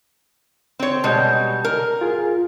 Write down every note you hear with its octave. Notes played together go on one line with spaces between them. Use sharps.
C4 C#5
B2 G3 G#3 A5 G6
A#4
F4 G#4